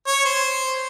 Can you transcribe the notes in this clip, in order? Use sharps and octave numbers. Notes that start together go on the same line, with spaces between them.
C#5
C5